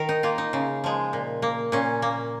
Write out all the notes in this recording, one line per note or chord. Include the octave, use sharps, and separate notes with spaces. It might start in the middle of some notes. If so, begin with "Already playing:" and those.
Already playing: D#3 A#4
D#4
A#3 F4
D#4
C#3
F3 G#3
A#2
A#3
A#2 C#4
A#3